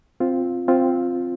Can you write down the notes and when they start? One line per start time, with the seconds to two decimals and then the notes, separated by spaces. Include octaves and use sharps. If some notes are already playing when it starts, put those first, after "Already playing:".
0.20 C4 F4
0.68 C4 F4